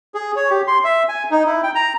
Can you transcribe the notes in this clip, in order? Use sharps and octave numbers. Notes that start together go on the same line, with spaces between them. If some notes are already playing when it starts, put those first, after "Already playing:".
G#4
C#5
G4
C6
E5
G#5
D#4
E4
G5
A#5